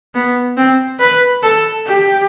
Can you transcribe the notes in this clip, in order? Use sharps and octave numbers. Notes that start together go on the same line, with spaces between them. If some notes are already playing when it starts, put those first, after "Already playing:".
B3
C4
B4
A4
G4